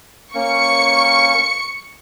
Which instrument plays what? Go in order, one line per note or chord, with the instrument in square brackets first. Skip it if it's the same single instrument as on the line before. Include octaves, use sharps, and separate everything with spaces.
[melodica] A#3 C#4 [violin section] C#6 C#7